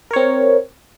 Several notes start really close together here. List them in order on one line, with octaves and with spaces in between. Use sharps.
A#4 C#5 C4